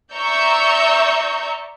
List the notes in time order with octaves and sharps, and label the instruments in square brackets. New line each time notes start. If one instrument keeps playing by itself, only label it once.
[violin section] D5 E5 A#5 C#6 E6 G6